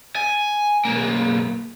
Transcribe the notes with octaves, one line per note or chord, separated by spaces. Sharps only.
G#5
B1 A#3